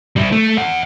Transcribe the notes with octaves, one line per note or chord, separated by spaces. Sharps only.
G3 E4
A3
E5 F#5